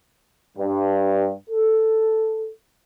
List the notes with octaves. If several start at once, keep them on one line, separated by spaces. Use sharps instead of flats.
G2
A4